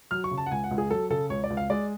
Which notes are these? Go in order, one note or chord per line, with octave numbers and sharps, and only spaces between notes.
F#3 F6
C#6
C#3
A5
F#5
C#2 G#5
F#5
C#2
G#4
F#3 A4
C#3 A4
C#2 C#5
D5
C#2
F5
G#3 D5